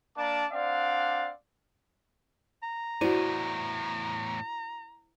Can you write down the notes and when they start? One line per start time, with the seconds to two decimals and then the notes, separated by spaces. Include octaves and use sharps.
0.16 A#3 D4 D5 A5 D6
0.51 C4 D4 D5 F5 F#5
2.63 A#5
3.01 E2 A2 E4 F#4 C5 D5 D#7